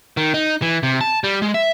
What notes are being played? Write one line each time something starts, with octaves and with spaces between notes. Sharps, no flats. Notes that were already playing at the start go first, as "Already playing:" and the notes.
D#3
D#4
E3
C3
A5
G3
G#3
E5